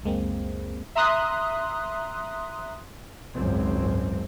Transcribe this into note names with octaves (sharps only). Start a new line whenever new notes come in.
C#2 F#2 G#3 A#3 C4
E5 A#5 C6 D#6 F#6
G#1 C#2 F#2 C4